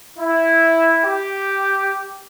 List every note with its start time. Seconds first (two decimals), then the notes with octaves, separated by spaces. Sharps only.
0.18 E4
1.05 G4